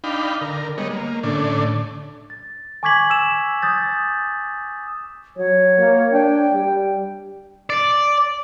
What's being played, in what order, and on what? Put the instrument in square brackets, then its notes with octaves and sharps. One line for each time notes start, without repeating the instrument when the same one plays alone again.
[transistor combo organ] D4 D#4 F5 G5 B5
D3 A#4
G3 G#3 B3 C#5 D#5
A#3
A2 D3 C#4 D4
[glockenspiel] A6
G#5 C#6 D6 G#6 B6 F#7
E6 E7
D#6 G6 A6
[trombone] F#3 [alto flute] C#5
[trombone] A#3
[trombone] D4 [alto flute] G5
[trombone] G3
[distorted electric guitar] D5